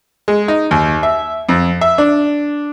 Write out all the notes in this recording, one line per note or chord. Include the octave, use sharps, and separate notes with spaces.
G#3
D#4
D#2
E5
F2
E5
D4